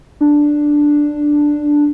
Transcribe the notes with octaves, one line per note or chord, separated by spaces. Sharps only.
D4